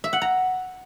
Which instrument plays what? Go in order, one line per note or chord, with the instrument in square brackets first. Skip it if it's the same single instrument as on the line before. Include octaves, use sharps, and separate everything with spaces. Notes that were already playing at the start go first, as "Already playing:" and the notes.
[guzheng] E5
F#5
A#5